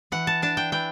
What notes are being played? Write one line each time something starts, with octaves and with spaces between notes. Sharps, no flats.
E3 F#5
A5
D4 A5
G5
E3 G5